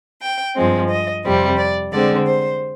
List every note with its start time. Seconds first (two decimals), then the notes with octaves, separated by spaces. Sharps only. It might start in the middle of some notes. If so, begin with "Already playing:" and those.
0.21 G5
0.55 G2 F3 G#3 C4
0.89 D#5
1.24 F2 C3 G3 C4
1.57 D5
1.92 D3 G#3 C4 D5
2.26 C5